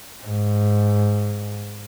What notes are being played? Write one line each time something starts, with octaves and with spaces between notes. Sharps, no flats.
G#2